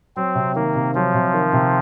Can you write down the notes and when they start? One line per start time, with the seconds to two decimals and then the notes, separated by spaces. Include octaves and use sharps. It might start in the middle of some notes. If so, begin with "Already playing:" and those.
0.16 F#3 C4
0.35 C3
0.55 D#3 A#3
0.75 C3
0.95 F3 F#3
1.14 C3
1.34 D#3
1.53 C3